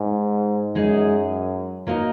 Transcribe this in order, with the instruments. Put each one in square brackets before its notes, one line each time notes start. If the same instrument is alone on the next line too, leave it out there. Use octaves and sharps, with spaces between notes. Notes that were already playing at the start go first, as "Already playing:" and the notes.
Already playing: [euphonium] G#2
[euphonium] F#2 [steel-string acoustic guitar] G#3 D#4 G#4 D#5
[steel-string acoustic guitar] F#3 A#3 D#4 A#4 D#5